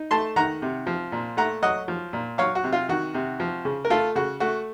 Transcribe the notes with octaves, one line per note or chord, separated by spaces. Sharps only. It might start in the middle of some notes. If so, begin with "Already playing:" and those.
Already playing: D#4
A3 A5 C6
D#3 F#5 A#5
C3
F3
A#2
A3 F#5 A#5
F#3 D#5 F#5
F3
A#2
F#3 C#5 F5
F#4
C3
F4
D#3 F#4
C3
F3
C#3
A#4
A3 F4 A4
C#3 F#4
A3 F#4